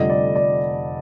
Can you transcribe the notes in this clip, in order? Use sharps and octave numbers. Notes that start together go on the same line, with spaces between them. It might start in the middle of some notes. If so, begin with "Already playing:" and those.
Already playing: F1 F2 D3 G3 D#5
D5
D5